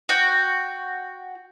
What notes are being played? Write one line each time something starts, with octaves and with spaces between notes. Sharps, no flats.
F#4 G5